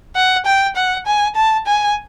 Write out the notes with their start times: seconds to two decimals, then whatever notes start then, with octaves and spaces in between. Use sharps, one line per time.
0.16 F#5
0.46 G5
0.76 F#5
1.07 G#5
1.36 A5
1.67 G#5